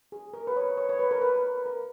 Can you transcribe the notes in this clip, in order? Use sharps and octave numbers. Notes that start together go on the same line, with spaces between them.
G#4
A#4
B4
C#5
C#5
C#5
B4
A#4
B4
A#4